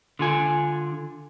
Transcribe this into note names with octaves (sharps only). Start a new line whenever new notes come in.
D3 F4 G#5